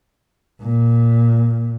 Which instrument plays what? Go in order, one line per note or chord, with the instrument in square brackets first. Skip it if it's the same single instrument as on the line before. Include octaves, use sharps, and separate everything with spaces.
[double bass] A#2